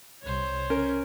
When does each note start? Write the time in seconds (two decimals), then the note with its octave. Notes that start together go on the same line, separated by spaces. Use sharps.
0.22 C2 C5 C#5
0.70 C#3 C#4 A#4